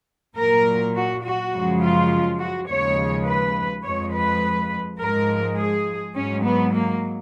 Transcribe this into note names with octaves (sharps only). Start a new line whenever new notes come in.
A#2 F#3 A#4
F#4
F#4
F#2 C#3 F3 G#3
F4
F#4
D#2 C#3 F3 G#3 C#5
B4
F2 F3 G#3 C#5
B4
G#2 F3 G#3 A#4
G#4
G#2 F#3 C#4
B3
A#3